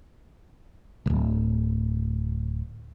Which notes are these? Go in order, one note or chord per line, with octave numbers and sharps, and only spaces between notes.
D1 G#1